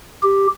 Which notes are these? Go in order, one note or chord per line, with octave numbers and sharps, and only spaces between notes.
G4